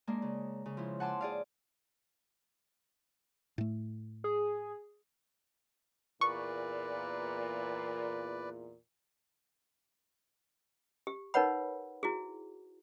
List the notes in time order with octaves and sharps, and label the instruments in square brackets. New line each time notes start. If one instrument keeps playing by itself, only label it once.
[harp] G#3 A#3 D4
C#3
C#3
F3 E4
F#5 G#5 A5 C6 D6 E6
G#4 D5 F5
[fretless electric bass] A2 A3
[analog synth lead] G#4
[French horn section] E2 A#2 [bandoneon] B4 D5 [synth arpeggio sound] C#6
[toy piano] G4
D#4 A#4 B4 C#5 F#5 B5
E4 F#4 G#4